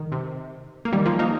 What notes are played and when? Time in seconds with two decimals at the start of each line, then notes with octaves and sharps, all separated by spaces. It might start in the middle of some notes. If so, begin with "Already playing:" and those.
Already playing: D#3
0.12 C3
0.85 A#3
0.93 D#3 G3
1.06 F3 A#3
1.19 A#3 D#4